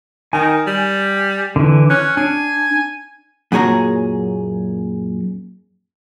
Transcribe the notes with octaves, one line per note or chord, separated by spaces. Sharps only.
D#3 G#5
G3
D3 E3
C#4 F#6
D4 G#5
F#2 A#2 G#4 C#5 A#5